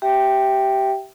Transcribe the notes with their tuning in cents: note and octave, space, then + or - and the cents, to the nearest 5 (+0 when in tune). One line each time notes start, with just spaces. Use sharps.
G4 -20 E5 +0 G5 +0